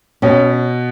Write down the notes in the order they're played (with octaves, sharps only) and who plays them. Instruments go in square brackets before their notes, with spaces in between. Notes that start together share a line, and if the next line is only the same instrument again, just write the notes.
[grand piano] B2 [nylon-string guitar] C#4